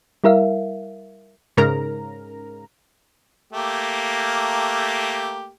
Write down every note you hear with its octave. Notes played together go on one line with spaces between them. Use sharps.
G3 E4 A#4 E5 F5
G#2 C#3 A#4 A#5
A3 A#3 G4